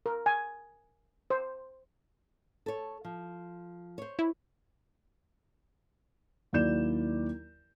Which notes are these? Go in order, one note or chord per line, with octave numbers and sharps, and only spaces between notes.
A#4
G#5
C5
A4 C#5
F3
C5 C#5
E4
D#2 F#3 E4 D5 G6 E7